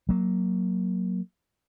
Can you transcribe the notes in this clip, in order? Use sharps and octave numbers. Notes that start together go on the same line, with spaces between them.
F#3 A#3